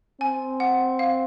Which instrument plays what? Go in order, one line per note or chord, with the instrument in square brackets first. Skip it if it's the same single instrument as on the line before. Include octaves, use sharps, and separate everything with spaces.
[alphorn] C4 [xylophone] G#5
[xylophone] F#5
F5